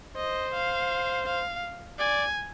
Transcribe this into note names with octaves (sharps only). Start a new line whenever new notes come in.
C5 D#5
F5
F5
D5 G#5